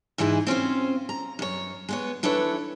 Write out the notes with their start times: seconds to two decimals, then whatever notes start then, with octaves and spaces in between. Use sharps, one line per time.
0.18 G#2 E3 D#4 E4 G#4
0.47 C4 C#4 F4 C5
1.09 A#5
1.39 F#2 C#5
1.89 G#3 B3 C#5
2.23 E3 D4 A4 B4 C#5